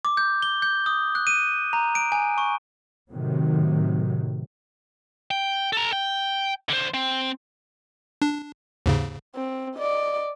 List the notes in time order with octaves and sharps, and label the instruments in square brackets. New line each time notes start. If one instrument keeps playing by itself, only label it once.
[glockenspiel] D6
G6
G7
G6
D#6
F#6
D#7
A#5
D7
G#5
C#6
[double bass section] A2 C3 D#3 F#3
[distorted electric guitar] G5
A4 A#5
G5
D3 C5
C4
[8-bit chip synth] D4
D#2 G#2 C#3
[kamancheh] C4
D5 D#5